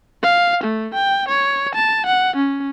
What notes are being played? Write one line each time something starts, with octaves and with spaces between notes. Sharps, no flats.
F5
A3
G5
C#5
A5
F#5
C#4